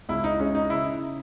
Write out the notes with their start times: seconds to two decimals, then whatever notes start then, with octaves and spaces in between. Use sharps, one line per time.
0.09 C#2 E4
0.24 D#4
0.39 G#3 C#4
0.55 D#4
0.69 C#3 E4